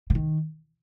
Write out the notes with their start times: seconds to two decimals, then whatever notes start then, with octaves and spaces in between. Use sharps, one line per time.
0.10 C#3
0.15 D#3